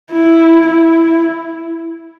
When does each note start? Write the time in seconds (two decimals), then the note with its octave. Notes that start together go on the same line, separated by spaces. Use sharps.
0.12 E4
0.67 E4